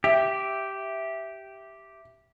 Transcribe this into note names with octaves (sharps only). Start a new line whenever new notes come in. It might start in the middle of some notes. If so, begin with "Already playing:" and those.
G4 E5